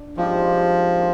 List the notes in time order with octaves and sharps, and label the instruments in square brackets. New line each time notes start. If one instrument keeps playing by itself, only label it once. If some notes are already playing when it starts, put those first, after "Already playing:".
Already playing: [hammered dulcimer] D4
[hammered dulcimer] G#2 G3 C4 G4 [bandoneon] F3
[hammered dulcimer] A#3 F4